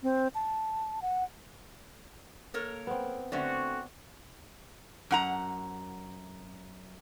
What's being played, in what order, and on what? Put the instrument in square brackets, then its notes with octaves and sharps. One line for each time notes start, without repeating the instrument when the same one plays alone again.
[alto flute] C4
A5
F#5
[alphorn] A#3 [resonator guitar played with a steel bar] A4 A#4 C#5
[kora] B3 C4
[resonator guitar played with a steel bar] D3 A3 C#4 [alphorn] C4 [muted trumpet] F#4 [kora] D5 E5 F#5
[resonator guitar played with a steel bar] F#2 F#5 A#5